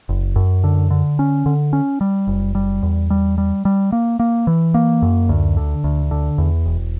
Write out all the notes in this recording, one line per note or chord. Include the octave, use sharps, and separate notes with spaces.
F#1
F#2
D3
D3
C#4
D3
C#4
G3
F#1
G3
E2
G3
G3
G3
A#3
A#3
E3
A#3
F#2
D2
D3
D2
D3
E2
E1